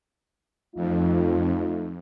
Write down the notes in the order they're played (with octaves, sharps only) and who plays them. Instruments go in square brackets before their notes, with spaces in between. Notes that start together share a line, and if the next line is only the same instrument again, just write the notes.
[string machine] F2 [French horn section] A3 D#4 F4